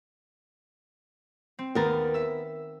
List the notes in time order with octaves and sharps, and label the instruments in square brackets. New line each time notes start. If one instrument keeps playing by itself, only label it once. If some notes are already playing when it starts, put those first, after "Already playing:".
[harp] C4
[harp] D#2 A6 [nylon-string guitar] B3 A#4
[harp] E5 E6